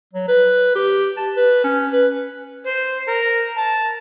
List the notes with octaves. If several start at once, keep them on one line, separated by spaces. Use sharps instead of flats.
F#3
B4
G4
A5
B4
C#4
B4
C5
A#4
A5